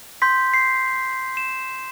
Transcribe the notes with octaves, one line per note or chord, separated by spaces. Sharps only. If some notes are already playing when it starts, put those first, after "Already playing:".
C6 G6 B6
C7
E7